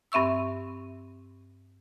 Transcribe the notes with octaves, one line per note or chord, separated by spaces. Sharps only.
G2 C4 E5 C#6 E6